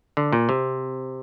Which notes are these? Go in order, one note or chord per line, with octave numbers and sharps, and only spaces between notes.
D3
A#2
C3